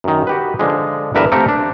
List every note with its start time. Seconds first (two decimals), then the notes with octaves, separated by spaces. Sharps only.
0.04 F#2 D#3
0.27 F#4 G4 B4
0.59 D3 F3 G#3
1.15 E2 G2 D3 A#4 B4 E5
1.32 A3 A#3 C4 G4 A4 A#4
1.48 D4